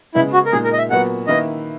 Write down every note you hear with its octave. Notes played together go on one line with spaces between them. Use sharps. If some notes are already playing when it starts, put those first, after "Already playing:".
C#3 G#3 B3 E4
F#4
A#4
A#2 G#3 D#4 G#4
A#4
D#5
E5
A#2 F#3 B3 F#4 F#5
D#3 A#3 E4 B4 D#5